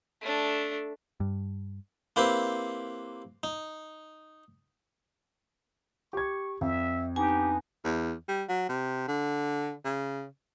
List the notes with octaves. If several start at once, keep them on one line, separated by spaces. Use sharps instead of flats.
A3 D4
G2
A#3 C4 E4 G4 B4 C5
D#4
G4 C#6 G#6
F2 E5
B3 D4 D#4 G4 G#5
E2
G3
F#3
C3
D3
C#3